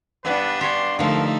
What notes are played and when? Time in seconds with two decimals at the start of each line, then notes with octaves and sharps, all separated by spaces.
0.25 G2 B3 D4 B4
0.61 G4 C#5 C6
0.99 D3 F3 A3 D#4 A#4